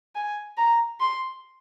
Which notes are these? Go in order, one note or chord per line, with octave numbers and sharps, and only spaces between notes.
G#5
A#5
C6